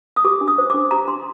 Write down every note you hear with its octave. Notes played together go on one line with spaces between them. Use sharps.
D#6
G4 D6
D4
D#6
C5
D6
D4
G4 A#5
D4 C6